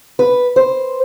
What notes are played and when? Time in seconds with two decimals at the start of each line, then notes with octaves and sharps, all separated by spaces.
0.19 B4
0.56 C5